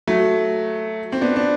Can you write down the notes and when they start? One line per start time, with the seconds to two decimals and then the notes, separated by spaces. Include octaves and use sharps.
0.07 F#3 A3
1.12 C4
1.21 B3 D4
1.36 D4